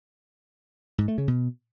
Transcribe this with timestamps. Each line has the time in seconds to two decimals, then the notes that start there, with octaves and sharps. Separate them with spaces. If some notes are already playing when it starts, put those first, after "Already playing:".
0.98 G#2
1.08 A3
1.18 C#3
1.28 B2